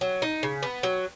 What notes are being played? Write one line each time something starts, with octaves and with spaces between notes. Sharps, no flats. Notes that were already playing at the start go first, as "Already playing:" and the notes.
F#3
D#4
C#3
B3
F#3